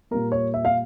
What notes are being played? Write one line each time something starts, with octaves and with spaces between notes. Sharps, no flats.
A#2 G3 A#3 A#4
C#5
E5
F5